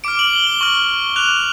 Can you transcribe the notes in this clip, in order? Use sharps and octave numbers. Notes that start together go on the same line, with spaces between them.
D6 F6 D7
F#7
G7
F#7
C#6 F6
D6 F#6 F7